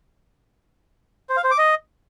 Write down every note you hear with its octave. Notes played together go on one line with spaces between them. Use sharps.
C5
F5
C5
D6
D#5